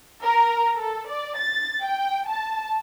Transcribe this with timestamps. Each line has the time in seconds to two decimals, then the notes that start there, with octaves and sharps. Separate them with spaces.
0.24 A#4
0.77 A4
1.08 D5
1.39 A6
1.81 G5
2.29 A5